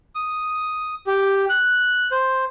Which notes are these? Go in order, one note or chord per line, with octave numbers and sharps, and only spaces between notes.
D#6
G4
F#6
C5